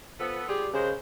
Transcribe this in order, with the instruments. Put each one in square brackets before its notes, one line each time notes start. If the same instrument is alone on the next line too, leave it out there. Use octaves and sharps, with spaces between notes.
[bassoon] F3 [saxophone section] B3 A4
[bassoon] G3 [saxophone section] F4 G4 G#4
[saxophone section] F#2 G#3 C5 [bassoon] C#3